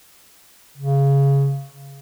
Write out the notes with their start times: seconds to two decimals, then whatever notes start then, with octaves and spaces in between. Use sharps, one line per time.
0.78 C#3